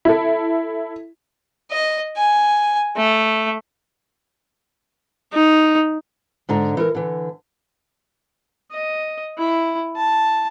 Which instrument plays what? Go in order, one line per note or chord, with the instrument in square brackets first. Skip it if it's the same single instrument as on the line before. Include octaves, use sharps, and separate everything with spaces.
[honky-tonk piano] E4 A4
[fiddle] D#5
G#5
A3
[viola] D#4
[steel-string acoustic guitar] G#2 D3 D4 A#5
E3 A#4
D3 E3
[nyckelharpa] D#5
E4
A5